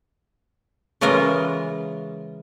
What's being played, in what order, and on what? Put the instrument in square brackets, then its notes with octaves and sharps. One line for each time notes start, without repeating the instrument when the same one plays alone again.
[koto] C#3 E3 G#3 F4 A#4